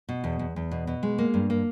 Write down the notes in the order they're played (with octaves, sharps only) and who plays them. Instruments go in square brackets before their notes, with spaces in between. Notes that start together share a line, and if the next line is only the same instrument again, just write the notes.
[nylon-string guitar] B2
E2
E2
E2
B2
B2
G#3
A#3
G2
A#3